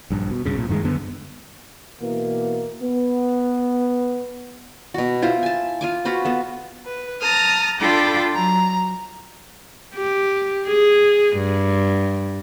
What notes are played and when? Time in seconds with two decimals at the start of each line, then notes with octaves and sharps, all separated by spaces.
0.10 A#1 G2
0.30 B2
0.46 C2 G2 C#3
0.57 B1 A#2
0.69 G2 D#3 F#3 G#3
0.84 F#2 D3 B3
2.00 B2 E3 A#3
2.82 B3
4.94 B2 F#4
5.22 E4 F4 C5
5.43 G#5 A5
5.81 F4 G#5 D6
6.05 F4 F#4 B4 C5
6.25 B3 A4
6.86 B4
7.21 A5 A#5 D#6 F6
7.80 D4 F4 A4 G5 B5 D6
8.34 F#3 A#5
9.95 G4
10.67 G#4
11.37 G2